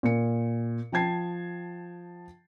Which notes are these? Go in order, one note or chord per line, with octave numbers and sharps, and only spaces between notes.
A#2 C#7
F3 G5 A5 G#6 C7